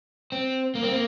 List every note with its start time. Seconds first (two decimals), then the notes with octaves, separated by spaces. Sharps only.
0.32 C4
0.75 A#3
0.83 C4
0.92 A#3